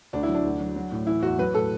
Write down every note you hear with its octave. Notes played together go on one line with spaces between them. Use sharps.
D2 D4
E4
F#3
D4
D2
F#3
F#3
A2
E3 E4
E2 F#4
F#3 B4
A2 A4